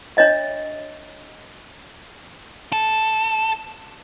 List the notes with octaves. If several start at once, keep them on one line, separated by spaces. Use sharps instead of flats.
D4 C#5 D#5 E5
A4